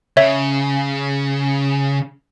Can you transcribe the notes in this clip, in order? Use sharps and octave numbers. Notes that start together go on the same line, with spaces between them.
C#3 C#5 E5